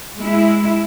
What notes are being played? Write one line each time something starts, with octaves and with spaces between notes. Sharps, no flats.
G#3 E4